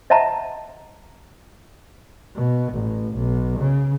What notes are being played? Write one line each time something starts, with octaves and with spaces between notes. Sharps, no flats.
D#5 E5 F#5 A5 A#5
B2
A1
B1
C#3